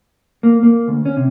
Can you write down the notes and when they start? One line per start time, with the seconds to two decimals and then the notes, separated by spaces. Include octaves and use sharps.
0.43 A#3
0.63 A#3
0.88 D2
1.05 C#4
1.17 C3